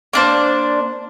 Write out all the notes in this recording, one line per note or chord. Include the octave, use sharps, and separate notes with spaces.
A#3 D4 C5